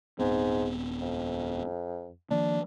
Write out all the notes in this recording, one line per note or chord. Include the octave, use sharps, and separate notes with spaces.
D#1 G#2 B3 C4
F2
D#3 F3 A#3 D4